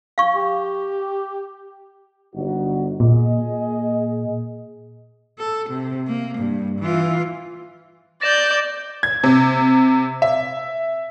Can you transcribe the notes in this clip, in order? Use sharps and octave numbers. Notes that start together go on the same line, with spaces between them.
F5 C#6
G4
G1 D#4 F#4
A#2 A#3 G#4 D#5
A4
C3
A#3
G2
E3 F4
D5 G6 A6 A#6 E7
G#6
C3
E5